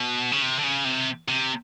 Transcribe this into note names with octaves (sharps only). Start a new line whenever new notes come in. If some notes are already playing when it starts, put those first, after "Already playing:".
Already playing: B2
C#3
C3
D3
C#3
C3
C3